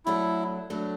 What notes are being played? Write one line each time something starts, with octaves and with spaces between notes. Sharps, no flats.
F#3 A3 D4 E4 A4
F#3 A3 D4 A4